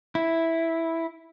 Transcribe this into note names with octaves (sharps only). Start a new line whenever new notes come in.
E4